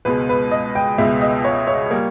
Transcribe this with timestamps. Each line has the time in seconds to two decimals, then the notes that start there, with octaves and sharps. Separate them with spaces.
0.05 C#2 B2 G#3 B4
0.29 B4
0.51 D#5
0.75 G5
0.98 C#2 B2 G#3 E5
1.21 D#5
1.45 C#5
1.68 C#5
1.91 G3 A#3